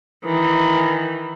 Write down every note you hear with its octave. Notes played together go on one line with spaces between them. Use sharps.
D#3 E3